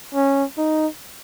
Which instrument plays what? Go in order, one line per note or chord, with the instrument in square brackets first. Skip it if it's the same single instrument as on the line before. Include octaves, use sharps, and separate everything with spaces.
[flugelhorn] C#4
D#4